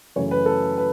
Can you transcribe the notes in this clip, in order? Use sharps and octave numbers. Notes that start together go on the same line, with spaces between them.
F#2 C#3 E3 A3 C#5
B4
A4
B4